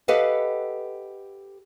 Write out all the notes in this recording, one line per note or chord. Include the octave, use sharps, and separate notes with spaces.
G4 A4 B4 D#5 F5 F#5